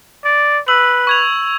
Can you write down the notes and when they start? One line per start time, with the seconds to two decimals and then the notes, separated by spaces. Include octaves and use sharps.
0.25 D5
0.68 B4 E6 F#7
1.07 C#6 G#6 F7